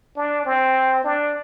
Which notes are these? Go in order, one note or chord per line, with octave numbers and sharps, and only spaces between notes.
D4
C4
D4